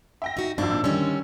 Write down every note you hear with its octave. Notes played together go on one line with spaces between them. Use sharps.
E5 G5 A#6
D#4 F#4
G#1 F3 D4 E6
A#2 E6
D3 D#3 G3 C#4